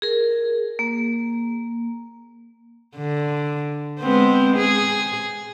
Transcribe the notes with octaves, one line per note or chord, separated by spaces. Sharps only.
G#4 A#4
A#3
D3
G#3 B3 C4
G#4